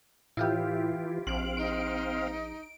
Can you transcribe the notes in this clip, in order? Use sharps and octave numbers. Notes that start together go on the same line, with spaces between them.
A2 E3 E4 F4 G4
A#1 C4 F5 D7 F#7
D#4 D7